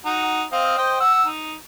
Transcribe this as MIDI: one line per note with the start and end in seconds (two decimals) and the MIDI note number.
0.05 0.42 63
0.05 0.42 66
0.52 0.78 60
0.52 0.78 75
0.52 0.78 77
0.78 0.99 72
0.78 0.99 75
0.78 0.99 79
1.00 1.25 78
1.00 1.25 88
1.25 1.53 63